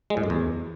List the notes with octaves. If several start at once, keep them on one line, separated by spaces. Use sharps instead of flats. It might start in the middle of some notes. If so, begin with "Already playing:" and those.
G#3
A2
F#2
E2